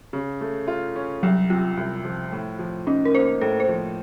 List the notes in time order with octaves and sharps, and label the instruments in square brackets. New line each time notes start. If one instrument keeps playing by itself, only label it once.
[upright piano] C#3
A3
F4
C#4
[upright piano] C2 [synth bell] F#3
[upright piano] C3 [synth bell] F4
[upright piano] C2
F3
A2
F3
[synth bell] C#4 [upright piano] D#4
[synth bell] A#4
[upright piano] A#3 [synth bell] C5
[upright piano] A2 [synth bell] A4
[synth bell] C5
[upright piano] F3